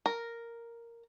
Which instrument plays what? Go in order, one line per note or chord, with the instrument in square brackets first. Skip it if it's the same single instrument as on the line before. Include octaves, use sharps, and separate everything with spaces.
[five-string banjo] A#4